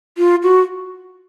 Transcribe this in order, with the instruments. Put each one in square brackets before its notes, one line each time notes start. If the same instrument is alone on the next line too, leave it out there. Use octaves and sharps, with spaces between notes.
[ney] F4
F#4